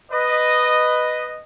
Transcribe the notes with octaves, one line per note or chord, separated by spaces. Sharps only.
B4 D#5